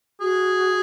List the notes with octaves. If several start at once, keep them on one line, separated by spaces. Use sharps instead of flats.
F#4 G#4